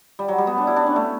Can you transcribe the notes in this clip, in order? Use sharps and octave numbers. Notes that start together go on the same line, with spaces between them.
G3
F#3
G3
B3
D4
E4
D4
C#4
A3